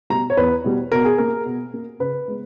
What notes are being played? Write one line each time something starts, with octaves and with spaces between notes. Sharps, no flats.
B2 G3 A#5
C#5
E2 B4
B2 G3
B2 A#4
G#4
A#3 A#4
B2
A#3
C#3 B4
G#3 B3